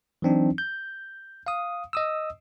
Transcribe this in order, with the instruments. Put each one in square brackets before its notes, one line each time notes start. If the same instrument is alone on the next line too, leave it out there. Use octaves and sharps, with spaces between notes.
[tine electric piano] E3 F#3 C4 D4 D#4
G6
F5 D#6
D#5 D#6 E6